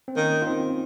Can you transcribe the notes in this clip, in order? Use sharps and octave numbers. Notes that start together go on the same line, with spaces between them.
C4
D#3 A#3 C#4
F4
C4 D#4